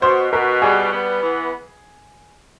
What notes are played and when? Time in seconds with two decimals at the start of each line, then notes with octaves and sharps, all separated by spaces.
0.02 B2 C5
0.32 B2 A#4
0.62 G3 G#4
0.93 B3
1.22 E3